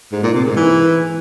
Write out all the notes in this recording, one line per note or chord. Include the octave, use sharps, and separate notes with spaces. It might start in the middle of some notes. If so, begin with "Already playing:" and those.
G#2
A#2
C3
G#2
E3